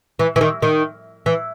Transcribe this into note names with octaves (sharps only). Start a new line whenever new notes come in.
E3
E3
D#3
D#3
E3